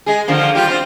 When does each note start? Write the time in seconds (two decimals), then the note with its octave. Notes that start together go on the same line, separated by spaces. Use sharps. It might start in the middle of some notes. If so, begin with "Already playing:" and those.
0.06 G#3 G#4
0.28 D3 F3 A#3
0.55 G3 F4 G4
0.68 C4 F4